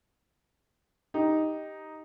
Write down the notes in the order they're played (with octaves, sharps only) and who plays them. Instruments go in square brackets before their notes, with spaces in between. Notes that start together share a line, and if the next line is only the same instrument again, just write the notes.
[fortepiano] D#4 G4